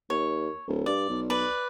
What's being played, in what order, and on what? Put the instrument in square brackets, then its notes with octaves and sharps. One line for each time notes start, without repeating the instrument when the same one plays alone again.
[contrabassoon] D#2 [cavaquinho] C#5
[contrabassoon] D1
[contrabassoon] G2 [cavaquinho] D5
[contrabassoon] B1
[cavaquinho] B4 D5